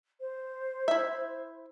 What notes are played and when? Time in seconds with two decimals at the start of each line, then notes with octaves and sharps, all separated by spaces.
0.20 C5
0.88 E4 E5